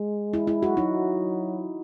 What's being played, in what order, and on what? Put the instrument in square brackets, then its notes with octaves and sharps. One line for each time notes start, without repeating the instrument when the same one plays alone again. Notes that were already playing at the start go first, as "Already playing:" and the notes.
Already playing: [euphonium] G#3
[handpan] E4
E4
F#4
[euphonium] F#3 [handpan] D#4